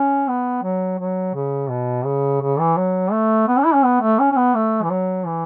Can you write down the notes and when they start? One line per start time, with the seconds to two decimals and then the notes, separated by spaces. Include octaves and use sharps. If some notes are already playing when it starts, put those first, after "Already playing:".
Already playing: C#4
0.28 B3
0.63 F#3
0.99 F#3
1.34 C#3
1.70 B2
2.05 C#3
2.41 C#3
2.59 E3
2.77 F#3
3.12 A3
3.48 B3
3.57 C#4
3.66 E4
3.74 C#4
3.84 B3
4.01 A3
4.19 C#4
4.32 C#4
4.36 B3
4.55 A3
4.83 E3
4.90 F#3
5.26 E3